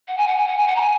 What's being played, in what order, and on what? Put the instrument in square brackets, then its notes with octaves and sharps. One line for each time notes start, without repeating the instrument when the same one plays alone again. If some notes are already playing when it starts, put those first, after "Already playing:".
[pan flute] F#5
G#5
F#5
G#5
F#5
G#5
F#5
A#5
G#5